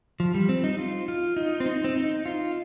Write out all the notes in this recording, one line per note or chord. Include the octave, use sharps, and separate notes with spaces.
F3
G3
C4
D#4
F4
F4
D#4
C4
D#4
C4
D#4
F4